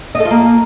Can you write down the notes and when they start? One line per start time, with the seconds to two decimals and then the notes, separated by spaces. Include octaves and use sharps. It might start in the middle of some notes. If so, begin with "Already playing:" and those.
0.15 D#5
0.20 A4
0.25 F4
0.31 A#3